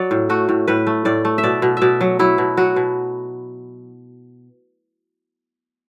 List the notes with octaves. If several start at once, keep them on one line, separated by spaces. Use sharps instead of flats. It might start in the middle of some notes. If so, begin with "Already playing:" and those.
Already playing: F#3 D5
A2
A3 F#4
A2
A2 B4
A3
A2 D5
A3
E5
B2 D5
B2
B2 D5 E5
F#3
F#3 E4
B2
F#3 F#4
B2